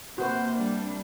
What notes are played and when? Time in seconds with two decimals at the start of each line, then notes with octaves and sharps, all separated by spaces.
0.18 C3 A#3 F#4 B4 C5
0.56 G3 D4